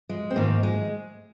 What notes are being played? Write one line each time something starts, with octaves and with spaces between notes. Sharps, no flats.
G#3
C4
G#2 D#3 A#3
G#3